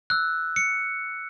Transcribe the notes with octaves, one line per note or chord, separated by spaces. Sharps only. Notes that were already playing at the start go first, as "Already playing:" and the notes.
E6 F#6
C#7